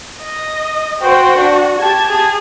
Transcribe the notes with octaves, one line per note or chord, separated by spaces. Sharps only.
D#5
F#4 C5 G5
D4
G4 A5 G#6
G#4